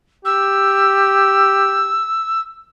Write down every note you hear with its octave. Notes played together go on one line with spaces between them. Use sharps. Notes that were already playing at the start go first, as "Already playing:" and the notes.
G4 E6